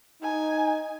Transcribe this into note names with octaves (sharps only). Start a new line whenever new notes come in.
D#4 G#5